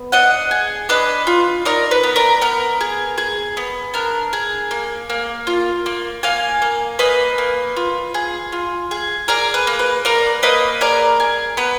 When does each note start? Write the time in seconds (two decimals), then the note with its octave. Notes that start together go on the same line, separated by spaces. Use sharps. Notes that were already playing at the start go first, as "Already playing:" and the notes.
Already playing: B3
0.12 D4 D#5 F#5
0.51 G#4
0.89 D4 B4 D#5
1.27 F4
1.65 D#4 A#4 D5
1.91 B4
2.03 B3
2.16 A#4 D5
2.41 B3 A#4
2.81 G#4
3.18 G#4
3.57 B3
3.94 D4 A#4
4.33 G#4
4.71 A#3
5.10 A#3
5.47 F4
5.86 A#3
6.23 A#3 F5 G#5
6.62 A#3
6.99 A#3 B4 D#5
7.38 A#3
7.77 F4
8.14 G#4
8.52 F4
8.91 G#4
9.28 G#4 A#4 D5
9.54 B4
9.67 A#3
9.79 B4
10.05 A#3 A#4 D5
10.43 A#3 B4 D#5
10.81 G#4 A#4 D5
11.20 G#4
11.57 B3 B4